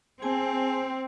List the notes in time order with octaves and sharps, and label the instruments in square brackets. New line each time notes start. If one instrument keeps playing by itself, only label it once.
[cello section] C4 [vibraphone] G#4 G#5 A5